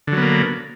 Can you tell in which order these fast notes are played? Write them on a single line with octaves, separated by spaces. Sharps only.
D3 F#3 B3 A#3